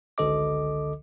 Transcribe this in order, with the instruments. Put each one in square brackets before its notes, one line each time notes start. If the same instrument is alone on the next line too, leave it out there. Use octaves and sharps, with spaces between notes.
[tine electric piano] G#1 C#2 D3 A4 D#5 D6